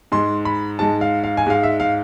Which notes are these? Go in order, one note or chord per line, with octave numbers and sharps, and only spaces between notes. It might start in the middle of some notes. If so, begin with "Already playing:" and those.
G#2 G#3 C6
B5
G#2 G#3 A5
F5
F5
G#5
G#2 G#3 F5
E5
F5